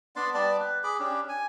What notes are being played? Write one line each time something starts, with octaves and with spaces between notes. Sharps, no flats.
B3 D4 D5 C6
G3 B3 D5 A5
B4
G#4 B5 D6
C#4 D4 G4
G#5